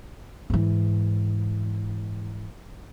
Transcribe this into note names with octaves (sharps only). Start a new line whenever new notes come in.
G#2 E3